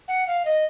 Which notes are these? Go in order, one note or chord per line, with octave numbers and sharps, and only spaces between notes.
F#5
F5
D#5